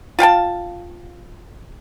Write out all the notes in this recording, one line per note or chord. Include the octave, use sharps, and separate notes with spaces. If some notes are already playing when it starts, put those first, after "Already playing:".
F4 F5 G5 A5